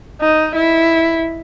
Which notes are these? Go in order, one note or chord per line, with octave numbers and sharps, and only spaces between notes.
D#4
E4